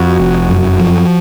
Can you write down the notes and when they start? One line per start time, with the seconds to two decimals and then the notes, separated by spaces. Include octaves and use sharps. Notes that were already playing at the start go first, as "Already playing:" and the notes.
Already playing: F2 F#4
0.19 F1
0.49 F#2
0.79 F3